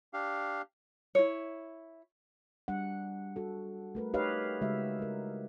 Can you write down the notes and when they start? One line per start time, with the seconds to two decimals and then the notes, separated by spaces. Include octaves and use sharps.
0.13 D4 G4 F5
1.15 E4 C#5
2.68 G3 D4 F#5
3.36 F#4 A4
3.95 A3 A#4 B4
4.14 D#4 G4 B4 C#5 D#5 F5
4.61 C#3 G#3 F#4 E5
4.99 E4 A#4